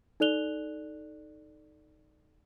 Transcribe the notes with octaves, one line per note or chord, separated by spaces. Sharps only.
D#4 A4 D5 F#6 F7 G7